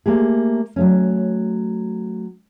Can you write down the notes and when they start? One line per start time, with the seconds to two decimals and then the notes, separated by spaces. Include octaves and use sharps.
0.06 A3 A#3 G4 G#4
0.76 F#3 A3 C#4